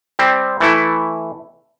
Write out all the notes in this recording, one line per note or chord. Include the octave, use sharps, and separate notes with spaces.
G3 C4
E3 A3 E4